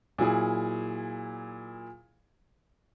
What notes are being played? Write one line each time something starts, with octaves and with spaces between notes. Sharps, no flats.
A#2 F#3 E4 G#4